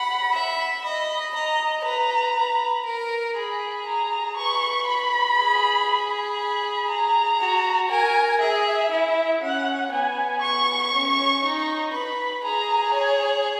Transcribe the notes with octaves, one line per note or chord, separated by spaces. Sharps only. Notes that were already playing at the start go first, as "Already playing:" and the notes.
Already playing: F#5 B5
E5 B5
D#5 B5
D#5 A#5
B4 A#5
B4
A#4
G#4 B5
A#5
B4 C#6
B5
G#4
B5
A#5
F#4
A#4 G#5
G#4 E5
E4
C#4 F#5
B3 G#5
C#6
C#4
D#4
B4 B5
G#4 A#5
C#5